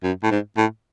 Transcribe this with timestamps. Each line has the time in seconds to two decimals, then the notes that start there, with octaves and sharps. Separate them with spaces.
0.03 F#2
0.23 A2
0.31 G#2
0.57 A2